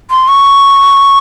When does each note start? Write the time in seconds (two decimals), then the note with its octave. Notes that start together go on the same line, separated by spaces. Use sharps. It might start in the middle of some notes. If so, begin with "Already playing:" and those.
0.10 C6
0.28 C#6